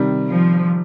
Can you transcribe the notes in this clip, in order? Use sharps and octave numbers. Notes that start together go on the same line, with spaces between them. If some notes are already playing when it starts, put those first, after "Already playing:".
Already playing: C3 D#3 G3
F3